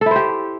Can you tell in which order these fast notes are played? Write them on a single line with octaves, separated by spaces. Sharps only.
A4 E4 C5 G4